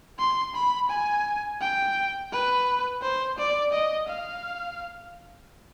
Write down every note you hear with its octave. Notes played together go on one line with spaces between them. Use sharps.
C6
B5
G#5
G5
B4
C5
D5
D#5
F5